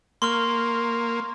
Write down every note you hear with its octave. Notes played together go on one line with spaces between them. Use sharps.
A#3 C6 C#6 F6